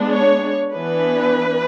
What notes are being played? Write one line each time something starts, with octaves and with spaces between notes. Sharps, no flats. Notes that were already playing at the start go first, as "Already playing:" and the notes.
Already playing: G#3 B3 D4
C#5
E3 B3 D4 B4